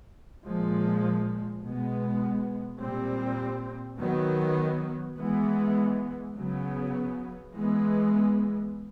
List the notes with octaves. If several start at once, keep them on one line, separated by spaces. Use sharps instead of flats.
A#2 F3 G#3
B2 G#3 B3
A#2 G3 C4
D#3 F#3 B3
E3 G#3 B3
C#3 F#3 B3
E3 G#3 B3